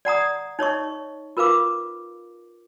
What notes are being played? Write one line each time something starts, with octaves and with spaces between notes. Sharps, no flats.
D5 F#5 A#5 D#6
D#4 C#5 D#5 C#6
F4 A#4 B4 F5 D6